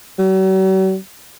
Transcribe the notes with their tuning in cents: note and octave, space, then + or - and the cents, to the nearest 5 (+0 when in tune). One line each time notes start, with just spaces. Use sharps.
F#3 +45